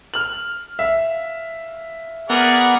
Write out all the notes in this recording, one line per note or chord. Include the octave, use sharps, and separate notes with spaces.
F6 F#7
E5 F5
B3 G#4 A#4 D5 F#5